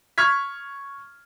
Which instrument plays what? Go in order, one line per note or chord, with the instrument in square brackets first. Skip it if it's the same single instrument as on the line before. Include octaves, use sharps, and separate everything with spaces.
[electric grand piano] C#6 F6 G#6 B6